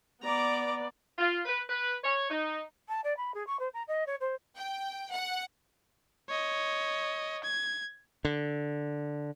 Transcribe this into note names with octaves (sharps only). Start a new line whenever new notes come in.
B3 D5 A#5 D6
F4
B4
B4
C#5
D#4
A5
D5
B5
G#4
C#6
C5
A#5
D#5
C#5
C5
G5
F#5
C#5 D#5
G#6
D3